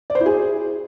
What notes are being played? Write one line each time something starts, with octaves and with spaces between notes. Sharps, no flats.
D5
C5
E4
G#4